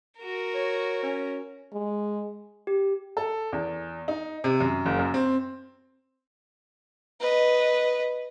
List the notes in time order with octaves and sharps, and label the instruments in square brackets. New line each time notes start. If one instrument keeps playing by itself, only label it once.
[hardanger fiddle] F#4 A#4
[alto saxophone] C#5
C#4
[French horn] G#3
[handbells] G4
[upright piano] A4
E2
D#4
C3
F#2
F#1
F#2
C4
[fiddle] B4 D#5